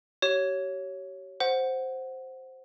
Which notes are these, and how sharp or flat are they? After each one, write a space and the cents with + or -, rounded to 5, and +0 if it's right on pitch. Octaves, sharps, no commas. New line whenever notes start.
G4 -40 C#5 +0
C5 +0 F#5 +0